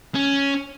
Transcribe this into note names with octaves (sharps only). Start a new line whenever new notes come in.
C#4